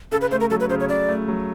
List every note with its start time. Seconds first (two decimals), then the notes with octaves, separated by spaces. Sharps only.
0.12 C#3 A4
0.21 B4
0.31 A3 C5
0.40 A#4
0.50 F#3 A4
0.60 B4
0.69 C#3 C5
0.80 C#5
0.89 C#3 D5
1.08 A3
1.28 F#3